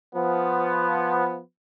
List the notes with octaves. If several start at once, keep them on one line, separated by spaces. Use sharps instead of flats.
F3 B3